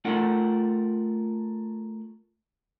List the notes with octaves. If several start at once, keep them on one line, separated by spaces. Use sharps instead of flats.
A3 F4 A4 A#4 F#5